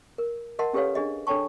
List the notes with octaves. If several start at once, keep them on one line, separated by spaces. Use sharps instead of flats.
A#4
A#4 D#5 F#5 A5 C6
C#4 G4 A4 B4 C#5 F5
D4 G#4 D#5
D4 A4 C#5 G5 A5 C#6